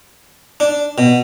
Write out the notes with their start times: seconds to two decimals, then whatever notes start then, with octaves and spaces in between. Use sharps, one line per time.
0.60 D4
0.98 B2